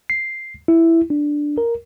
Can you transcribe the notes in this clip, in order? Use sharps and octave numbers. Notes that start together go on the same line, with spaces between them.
C7
E4
D4
A#4